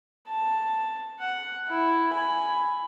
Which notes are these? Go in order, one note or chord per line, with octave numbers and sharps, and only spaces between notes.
A5
F#5
E4
G#5 B5